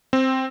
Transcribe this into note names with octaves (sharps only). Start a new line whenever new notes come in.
C4